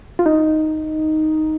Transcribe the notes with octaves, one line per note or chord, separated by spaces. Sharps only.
F4
D#4